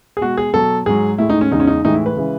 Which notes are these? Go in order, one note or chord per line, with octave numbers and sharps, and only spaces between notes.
G#4
B2 G#3 F#4
G#4
B2 F#3 A4
G#2 F#3 G#4
A2 G#3 E4
D#4
C#4
E2 C#3 G#3 D#4
C#4
D#4
A2 E3 G#3 D#4
E4
B4
C#3 E3 G#3